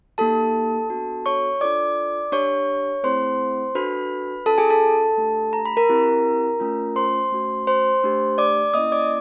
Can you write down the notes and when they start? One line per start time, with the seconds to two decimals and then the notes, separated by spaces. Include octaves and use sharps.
0.18 A#3 D#4 G4 A4 A5
0.89 B3 D4 F#4 A4
1.26 C#5 C#6
1.61 D4 F4 A4 D5 D6
2.32 D4 G4 C#5 C#6
3.03 A3 C4 E4 G#4 C5 C6
3.75 D4 F#4 A4 B4 B5
4.46 C#4 F4 A4 A5
4.58 G#4 G#5
4.70 A4 A5
5.18 A3 D4 G4
5.53 A#5
5.65 B5
5.77 A#4 A#5
5.89 C4 E4 G4
6.60 A3 C#4 F4
6.96 C5 C6
7.32 A3 C#4 F#4
7.67 C5 C6
8.03 A3 D4 G4
8.38 D5 D6
8.74 A#3 C#4 E4 D#5 D#6
8.92 D5 D6